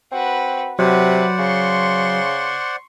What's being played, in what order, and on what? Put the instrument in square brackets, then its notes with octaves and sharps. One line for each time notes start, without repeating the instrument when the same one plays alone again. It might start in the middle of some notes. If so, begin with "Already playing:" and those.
[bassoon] C4 [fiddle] F#4 B4
[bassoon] C3 [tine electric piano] F#3 [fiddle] F#4 B4 [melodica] C5 D5 F#5
[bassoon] C#3 [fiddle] C6 C#6